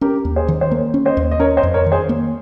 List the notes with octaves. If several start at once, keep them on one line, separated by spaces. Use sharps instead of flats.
C#4 G4 A#4
D#2
G#4 C5
D#3
C5
A#3 A#4 C#5
C#4
C5 D#5
D#2
D#5
C#4 A#4 C#5
C5 D#5
F2
A#4 C#5
D#3
G#4 C5
A#3